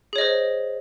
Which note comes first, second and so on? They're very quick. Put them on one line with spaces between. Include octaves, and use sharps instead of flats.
G#4 C#5 D#5 C5